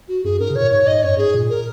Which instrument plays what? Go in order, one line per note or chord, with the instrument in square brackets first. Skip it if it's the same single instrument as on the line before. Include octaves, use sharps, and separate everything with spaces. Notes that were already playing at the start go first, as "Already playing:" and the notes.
[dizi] F#4
[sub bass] F#2 [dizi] G#4
[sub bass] G#2 [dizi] A#4
[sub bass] C#3
[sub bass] A#2 [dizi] C#5
[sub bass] G#2 [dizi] C#5
[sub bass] G#2 [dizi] D#5
[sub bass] F#2 [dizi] C#5
[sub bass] G#2 [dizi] G#4
[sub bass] A#2
[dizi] A#4